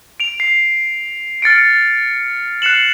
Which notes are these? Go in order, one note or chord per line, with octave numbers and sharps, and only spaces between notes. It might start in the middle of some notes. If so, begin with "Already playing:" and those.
D7 F7
C7
F6 A6 C#7 D7
F#6 C7 C#7 E7 F#7